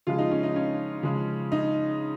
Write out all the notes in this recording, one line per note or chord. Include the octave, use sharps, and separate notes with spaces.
C#3 F3 G#3 F4
D#4
C#4
D#4
C#4
C#3 F3 G#3
D#4